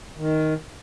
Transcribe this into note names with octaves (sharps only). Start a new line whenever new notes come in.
D#3